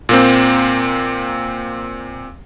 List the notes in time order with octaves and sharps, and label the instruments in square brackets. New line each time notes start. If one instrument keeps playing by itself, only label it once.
[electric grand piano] A#2 A#3 C4